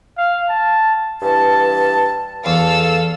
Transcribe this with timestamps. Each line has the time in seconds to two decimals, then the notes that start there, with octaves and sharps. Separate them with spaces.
0.18 F5
0.49 A5
1.21 G2 E3 A5
2.46 E2 A4 F5 E6